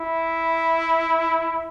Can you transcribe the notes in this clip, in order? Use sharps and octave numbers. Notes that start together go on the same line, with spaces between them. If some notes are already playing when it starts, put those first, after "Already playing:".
Already playing: E4